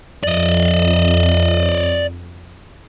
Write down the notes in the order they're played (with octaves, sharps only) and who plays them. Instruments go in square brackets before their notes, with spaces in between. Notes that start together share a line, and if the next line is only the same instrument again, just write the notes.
[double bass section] F2 [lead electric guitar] D5 D#5